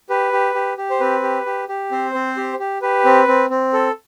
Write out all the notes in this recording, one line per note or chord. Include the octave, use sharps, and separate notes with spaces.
G4 B4
G4
G4
G4
C5
C4 B4
G4
G4
G4
C4 C5
C4
G4
G4
G4 B4
C4
C4
C4
A4